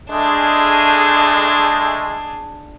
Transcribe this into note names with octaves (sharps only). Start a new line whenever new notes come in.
G#3 A3 D4 G#4